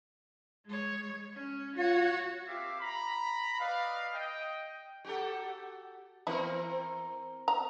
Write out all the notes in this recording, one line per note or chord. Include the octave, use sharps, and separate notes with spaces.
G#3 C#5
C#4
F4 F#4 C#5
A#3 C4 G4 E5 F5 D6
A#5 B5
B4 D5 D#5 F5
D#5 G5
F#4 G4 A4
E3 B3 C4 E4 A#4
A#5